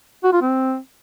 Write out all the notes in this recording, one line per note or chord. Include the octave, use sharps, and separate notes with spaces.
F#4
F4
C4